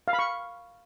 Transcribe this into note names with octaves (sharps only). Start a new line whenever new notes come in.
F5
B5
C#6